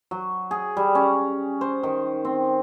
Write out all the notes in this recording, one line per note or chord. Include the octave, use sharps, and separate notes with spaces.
F#3
G#4
G3
C#4
C5
D#3
C4